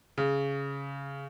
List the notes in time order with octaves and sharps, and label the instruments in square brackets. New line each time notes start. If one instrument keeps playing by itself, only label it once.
[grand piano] C#3